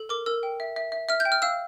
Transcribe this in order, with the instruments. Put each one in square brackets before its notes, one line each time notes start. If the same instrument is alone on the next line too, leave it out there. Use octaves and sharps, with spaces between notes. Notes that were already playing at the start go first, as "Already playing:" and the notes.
Already playing: [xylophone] A4
A#4 D6
A#4 E6
G5
E5
E5
E5
E5 F6
G6
G5
F6
F5 E6